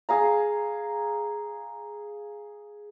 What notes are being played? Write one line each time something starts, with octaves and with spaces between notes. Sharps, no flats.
G#4 F5 A#5